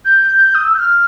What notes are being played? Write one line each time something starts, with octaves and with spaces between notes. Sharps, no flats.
G6
D#6
E6
G6
F6